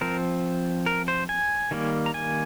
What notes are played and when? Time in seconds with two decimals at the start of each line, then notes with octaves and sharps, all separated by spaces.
0.01 F3 C4 A#4
0.86 A#4
1.08 C5
1.29 G#5
1.71 D#3 G3 A#3
2.06 A#5
2.14 G#5